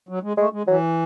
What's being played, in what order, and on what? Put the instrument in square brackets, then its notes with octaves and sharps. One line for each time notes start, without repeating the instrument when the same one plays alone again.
[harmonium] F#3
G#3
[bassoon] G#3 [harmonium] A3
[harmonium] G#3
[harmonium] E3 [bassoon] F#3